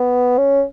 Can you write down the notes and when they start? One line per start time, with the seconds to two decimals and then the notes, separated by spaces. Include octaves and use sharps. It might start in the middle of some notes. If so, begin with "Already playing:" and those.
Already playing: B3
0.38 C#4